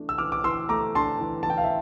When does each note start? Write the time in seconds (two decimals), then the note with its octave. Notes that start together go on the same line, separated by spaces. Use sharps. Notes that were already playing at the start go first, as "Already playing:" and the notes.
Already playing: E3 A3 D4
0.09 E6
0.18 E3 D6 F6
0.32 D6
0.44 E3 C6 E6
0.69 A3 A#5 D6
0.95 D4 A5 C6
1.20 E3
1.43 A5
1.46 E3 G5
1.58 F5
1.64 E5